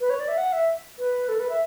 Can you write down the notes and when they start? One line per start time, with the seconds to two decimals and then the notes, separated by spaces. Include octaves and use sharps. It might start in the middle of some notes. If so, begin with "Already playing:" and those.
0.01 B4
0.10 C#5
0.20 D5
0.28 E5
0.37 F#5
0.53 E5
0.99 B4
1.29 A4
1.39 B4
1.49 E5